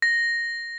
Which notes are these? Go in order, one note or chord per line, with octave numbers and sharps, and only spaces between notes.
A#6